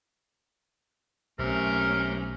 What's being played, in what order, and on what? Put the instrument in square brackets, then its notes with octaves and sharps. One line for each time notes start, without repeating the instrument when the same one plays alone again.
[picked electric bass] B1 [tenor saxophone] C3 [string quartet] A3 C#4 [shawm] A#4